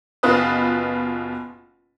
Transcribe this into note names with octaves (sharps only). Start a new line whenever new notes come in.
F#1 B2 F4 B4 D#6